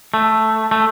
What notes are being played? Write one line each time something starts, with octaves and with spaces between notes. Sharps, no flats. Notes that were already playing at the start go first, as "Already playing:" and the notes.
A3
A3